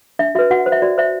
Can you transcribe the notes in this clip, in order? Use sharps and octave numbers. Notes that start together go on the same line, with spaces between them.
D4 E5
F#4 B4 E5
F#4 F#5
C5
E5
F#4 D5
C5 E5